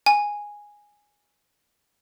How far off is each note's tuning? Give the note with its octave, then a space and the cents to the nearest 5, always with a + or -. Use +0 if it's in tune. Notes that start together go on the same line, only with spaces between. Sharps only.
G#5 -5